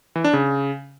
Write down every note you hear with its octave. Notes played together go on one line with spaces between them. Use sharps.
E3
D4
C#3